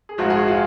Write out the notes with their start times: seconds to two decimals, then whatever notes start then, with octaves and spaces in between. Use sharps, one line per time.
0.09 G#4
0.18 A#1 G#2 F3 F#4
0.30 G#4
0.38 F#4
0.48 F4